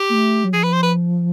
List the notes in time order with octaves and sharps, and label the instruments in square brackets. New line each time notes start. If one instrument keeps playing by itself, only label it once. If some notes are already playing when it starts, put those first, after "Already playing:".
Already playing: [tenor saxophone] G4
[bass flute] A#3
A3
F#3
[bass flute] F3 [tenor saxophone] G#4
[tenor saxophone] B4
C5
B4